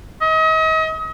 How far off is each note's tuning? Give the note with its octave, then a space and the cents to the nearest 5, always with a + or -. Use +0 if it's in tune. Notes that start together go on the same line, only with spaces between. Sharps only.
D#5 +40